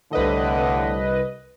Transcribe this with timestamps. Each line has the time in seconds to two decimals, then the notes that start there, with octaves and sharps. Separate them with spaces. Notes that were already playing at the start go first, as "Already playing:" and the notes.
0.13 C2 A2 D3 B4 D#5